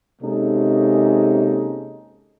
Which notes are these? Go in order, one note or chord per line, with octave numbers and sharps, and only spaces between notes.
C3 G#3 A#3 C#4 D#4 A4